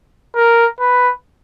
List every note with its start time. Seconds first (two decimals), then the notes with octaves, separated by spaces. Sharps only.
0.35 A#4
0.80 B4